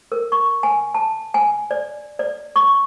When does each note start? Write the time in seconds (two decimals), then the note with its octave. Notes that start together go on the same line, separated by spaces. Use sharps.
0.12 A#4
0.32 C#6
0.63 G#5
0.94 A5
1.34 G#5
1.71 D5
2.19 D5
2.56 C#6